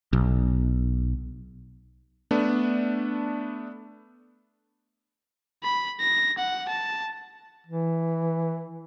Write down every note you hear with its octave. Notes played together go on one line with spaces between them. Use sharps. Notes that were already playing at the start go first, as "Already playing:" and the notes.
B1
A3 B3 D4
B5
A#6
F#5
A5
E3